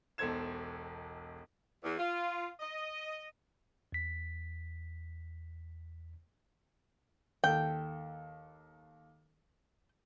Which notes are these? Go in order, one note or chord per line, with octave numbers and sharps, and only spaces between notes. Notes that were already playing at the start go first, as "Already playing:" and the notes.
E1 B1 A4 C5 G#6 E7
E2
F4
D#5
E2 B6
D#2 A4 G5